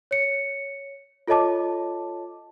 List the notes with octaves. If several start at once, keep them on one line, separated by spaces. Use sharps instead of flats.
C#5 C#7
F4 A4 C#5 D#5 A5 D6